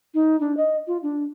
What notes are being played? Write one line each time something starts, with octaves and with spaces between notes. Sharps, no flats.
D#4
D4
D#5
F4
D4